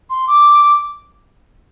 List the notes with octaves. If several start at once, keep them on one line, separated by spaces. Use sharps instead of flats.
C6
D6